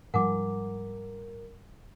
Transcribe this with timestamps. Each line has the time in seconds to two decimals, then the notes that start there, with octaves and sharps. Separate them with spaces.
0.14 G#2 F3 G3 A#4 F#5 G#5 D6